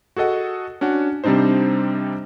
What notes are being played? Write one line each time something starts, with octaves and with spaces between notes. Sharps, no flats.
F#4 G#4 A4 D#5 F#5
C#4 D4 F#4 F#5
C3 G3 C4 D4 D#4 C5